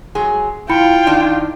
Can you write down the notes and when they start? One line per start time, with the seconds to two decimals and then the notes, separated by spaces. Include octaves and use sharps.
0.15 F#3 G#3 G#4
0.69 F3 E4 F4 G5 B5 C#7
1.07 D#3 D4 D#4